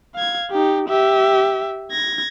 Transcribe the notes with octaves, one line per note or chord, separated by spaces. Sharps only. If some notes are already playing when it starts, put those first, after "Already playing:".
F5 G#6
D#4 G4
G4 E5
G#6 A#6